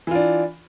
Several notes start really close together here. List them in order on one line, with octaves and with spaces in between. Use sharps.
E3 F4 D4